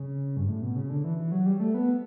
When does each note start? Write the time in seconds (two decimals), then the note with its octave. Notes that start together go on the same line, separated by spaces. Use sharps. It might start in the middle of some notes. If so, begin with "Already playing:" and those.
Already playing: C#3
0.37 G2
0.48 A2
0.62 B2
0.76 C#3
0.90 D3
1.04 E3
1.18 E3
1.32 F#3
1.46 G3
1.60 A3
1.74 B3